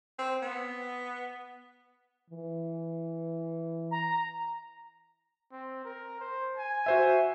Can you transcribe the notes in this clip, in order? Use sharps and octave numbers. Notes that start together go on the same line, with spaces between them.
C4
B3
E3
A#5
C4
A#4
C5
G#5
F#4 C5 E5